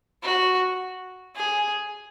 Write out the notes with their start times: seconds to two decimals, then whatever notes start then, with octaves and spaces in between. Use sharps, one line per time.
0.23 F#4
1.36 G#4